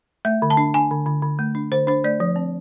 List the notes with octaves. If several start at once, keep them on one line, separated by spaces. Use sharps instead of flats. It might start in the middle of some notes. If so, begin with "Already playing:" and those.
A3 E5
D3
A5
D4
D4 G#5
D3
D3
D3
A3
D4
D3 C5
D4 C5
A3 D5
F3
C4